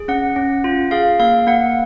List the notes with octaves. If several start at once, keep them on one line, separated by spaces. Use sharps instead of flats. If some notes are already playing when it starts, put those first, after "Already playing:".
Already playing: G#4
C#4 F#5
C#4
F4
G#4 F5
A#3 F5
A#3 F#5